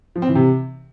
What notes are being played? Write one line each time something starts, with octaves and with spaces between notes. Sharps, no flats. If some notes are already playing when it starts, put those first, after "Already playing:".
F3
C4
E3
C3